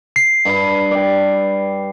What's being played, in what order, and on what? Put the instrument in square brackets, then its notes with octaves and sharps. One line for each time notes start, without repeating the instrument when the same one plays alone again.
[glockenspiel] C7
[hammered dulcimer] G2 B5
D5 G5